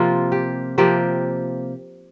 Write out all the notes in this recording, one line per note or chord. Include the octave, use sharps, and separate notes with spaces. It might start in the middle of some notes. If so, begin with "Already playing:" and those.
Already playing: C3 F3 A#3 F4
G4
C3 F3 A#3 G4